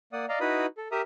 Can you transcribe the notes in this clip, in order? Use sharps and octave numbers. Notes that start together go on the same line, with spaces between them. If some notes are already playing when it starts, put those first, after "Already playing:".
A#3 D5 F#5 D#6
D5 D#5 F5 A#5
D#4 E4 F#4 B4 B5 D#6
A4
G4 A#4 E5 A#5 D#6